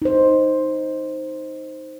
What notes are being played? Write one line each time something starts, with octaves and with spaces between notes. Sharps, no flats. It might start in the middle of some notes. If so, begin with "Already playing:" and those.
D#4 C5